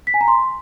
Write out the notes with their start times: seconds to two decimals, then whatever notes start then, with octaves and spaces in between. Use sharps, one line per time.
0.07 B6
0.14 G#5
0.21 A#5
0.28 C6